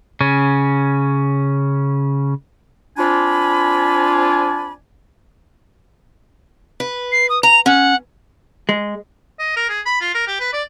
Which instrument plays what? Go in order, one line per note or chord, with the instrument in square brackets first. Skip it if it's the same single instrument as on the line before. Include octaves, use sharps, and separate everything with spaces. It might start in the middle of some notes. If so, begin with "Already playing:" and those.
[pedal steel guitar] C#3 C#4
[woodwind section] C4 D4 F4 D5 G#5 B5
[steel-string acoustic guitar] B4
[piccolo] C7
D#6
[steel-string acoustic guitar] A#5 [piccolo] F7
[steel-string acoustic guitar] C#4 [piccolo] F#5
[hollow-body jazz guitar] G#3
[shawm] D#5
A#4
G#4
B5
F4
A#4
G4
B4
D5